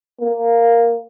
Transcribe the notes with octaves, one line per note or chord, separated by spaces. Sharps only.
A#3